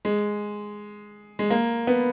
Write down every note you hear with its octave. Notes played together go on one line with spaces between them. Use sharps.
G#3
G#3
A#3
B3